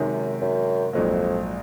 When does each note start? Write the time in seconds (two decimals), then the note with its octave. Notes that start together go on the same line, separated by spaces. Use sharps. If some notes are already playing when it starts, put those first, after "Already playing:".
Already playing: F#2 C3 D#3 G#3
0.41 F#2
0.93 A#1 F2 G#2 F#3 A#3